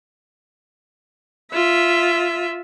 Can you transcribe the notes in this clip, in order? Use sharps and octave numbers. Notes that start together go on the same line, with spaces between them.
F4 E5